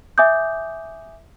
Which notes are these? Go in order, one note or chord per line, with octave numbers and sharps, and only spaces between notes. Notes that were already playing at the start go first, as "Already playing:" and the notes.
E5 G#5 D6 D#6 G6